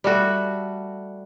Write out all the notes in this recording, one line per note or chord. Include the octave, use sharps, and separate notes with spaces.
G3 A3 F#4 A4